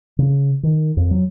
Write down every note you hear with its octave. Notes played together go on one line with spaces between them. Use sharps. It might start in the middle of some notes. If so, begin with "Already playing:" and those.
C#3
D#3
F2
F#3